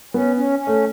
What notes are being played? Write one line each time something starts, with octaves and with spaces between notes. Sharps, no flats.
B3 C#4
C#4
C#4
A3